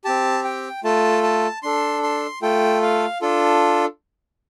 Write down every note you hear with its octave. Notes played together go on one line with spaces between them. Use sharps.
C4 G4 A5
G5
A3 F4 A4 A5
A5
D4 A4 C6
C6
A3 F4 A4 G5
F5
D4 F4 A4